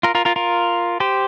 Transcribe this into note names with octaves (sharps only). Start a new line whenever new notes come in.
F4 A#4
F4 A#4
F4 A#4
F4 A#4
G4 C5